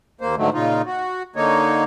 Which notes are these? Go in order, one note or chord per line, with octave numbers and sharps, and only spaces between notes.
D#2 A#3 C5
G#2 D3 D#3 F#3 A3
A#2 C#3 D#4 F4
F#4
D3 A#3 D#4 C#5